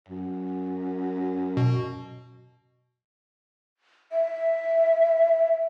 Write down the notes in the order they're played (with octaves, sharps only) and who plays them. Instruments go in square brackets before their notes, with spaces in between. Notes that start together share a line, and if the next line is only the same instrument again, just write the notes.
[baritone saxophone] F#2
[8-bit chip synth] B2
[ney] E5